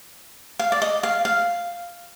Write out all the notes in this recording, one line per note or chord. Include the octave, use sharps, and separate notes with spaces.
F5
D5
D#5
F5
F5